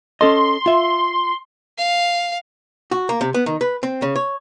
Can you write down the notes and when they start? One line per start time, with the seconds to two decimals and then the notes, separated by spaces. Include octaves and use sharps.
0.21 C#4 A4 D#5 C6
0.66 F4 E5
1.78 F5
2.91 F#4
3.09 A#3
3.21 C3
3.34 B3
3.46 D#3
3.61 B4
3.83 C4
4.02 C#3
4.16 C#5